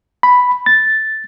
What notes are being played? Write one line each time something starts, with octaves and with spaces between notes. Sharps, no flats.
B5
A6